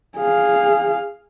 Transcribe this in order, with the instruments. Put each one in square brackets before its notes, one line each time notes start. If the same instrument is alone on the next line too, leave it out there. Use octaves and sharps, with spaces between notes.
[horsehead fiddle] G#4 F5